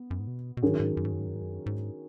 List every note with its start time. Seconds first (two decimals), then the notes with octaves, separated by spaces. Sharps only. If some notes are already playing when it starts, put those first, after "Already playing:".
Already playing: B3
0.11 F#2
0.20 G#2
0.27 B2
0.57 B2
0.62 G#2 D#3 F#3 C#4 G#4
0.80 G#2
0.97 F#2
1.05 G#2
1.12 F#2
1.19 G#2
1.27 F#2
1.34 G#2
1.42 F#2
1.66 G#2